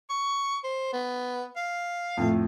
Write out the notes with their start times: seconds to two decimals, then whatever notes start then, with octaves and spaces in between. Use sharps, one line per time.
0.10 C#6
0.64 C5
0.93 B3
1.56 F5
2.17 F2 A2 A3